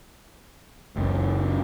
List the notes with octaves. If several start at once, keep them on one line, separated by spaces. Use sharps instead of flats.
F#1 C#2